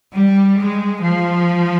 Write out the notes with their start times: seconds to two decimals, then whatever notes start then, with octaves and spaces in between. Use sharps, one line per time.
0.15 G3
0.60 G#3
1.03 F3